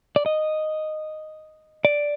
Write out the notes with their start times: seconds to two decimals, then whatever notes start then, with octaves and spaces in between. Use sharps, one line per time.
0.16 D5
0.26 D#5
1.85 D5